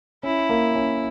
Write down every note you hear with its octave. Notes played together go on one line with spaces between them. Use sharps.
C#4 E4
A#3
C#4